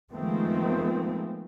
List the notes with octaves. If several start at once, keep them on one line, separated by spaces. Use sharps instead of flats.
D#3 F3 G#3 A3 B3 C4